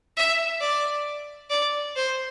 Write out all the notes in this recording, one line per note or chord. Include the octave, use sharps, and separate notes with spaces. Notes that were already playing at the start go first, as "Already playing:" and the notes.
E5
D5
D5
C5